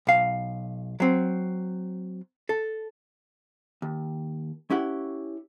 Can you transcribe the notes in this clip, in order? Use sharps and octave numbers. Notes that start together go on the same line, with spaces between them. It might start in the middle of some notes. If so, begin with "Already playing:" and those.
B1 F5
F#3 C4
A4
D#2
C#4 E4 G4 F#5